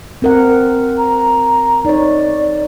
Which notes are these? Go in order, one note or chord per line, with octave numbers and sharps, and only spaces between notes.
C4 A#4 F#5
A#5
D#4 C#5 D5